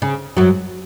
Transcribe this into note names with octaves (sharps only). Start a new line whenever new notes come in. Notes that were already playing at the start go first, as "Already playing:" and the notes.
C#3
F#2 F#3